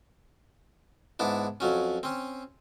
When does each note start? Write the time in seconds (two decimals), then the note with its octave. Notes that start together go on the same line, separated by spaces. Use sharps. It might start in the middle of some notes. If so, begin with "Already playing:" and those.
1.19 G#2 B3 D4 E4
1.60 F2 F#3 C#4
2.03 C4 C#4